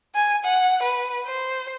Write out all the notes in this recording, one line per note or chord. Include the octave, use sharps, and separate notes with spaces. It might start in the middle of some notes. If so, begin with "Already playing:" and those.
G#5
F#5
B4
C5